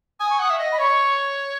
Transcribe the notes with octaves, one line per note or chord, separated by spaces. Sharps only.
G#5 D#6
C#6
F#5 D#6
E5
D#5
B5
C#5 C#6